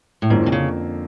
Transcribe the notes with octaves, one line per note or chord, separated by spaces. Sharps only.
A2
F2 G#2 D3 F3 A#3 C#4
C3
C#3